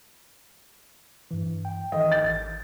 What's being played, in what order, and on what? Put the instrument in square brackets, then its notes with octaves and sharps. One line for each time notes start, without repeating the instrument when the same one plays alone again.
[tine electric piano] G2 E3
G5
[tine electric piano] D#3 E3 A4 [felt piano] D#5
[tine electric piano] G#1 G6 [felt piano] A6